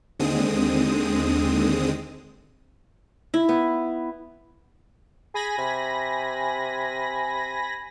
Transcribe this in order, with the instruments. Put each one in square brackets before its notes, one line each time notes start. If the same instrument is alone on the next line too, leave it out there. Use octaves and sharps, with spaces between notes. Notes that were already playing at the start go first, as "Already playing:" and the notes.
[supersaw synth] D#2 D3 G#3 C4 D#6
[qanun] E4
B3
[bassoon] G#4 [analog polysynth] G#5 B5 A#6
[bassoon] C3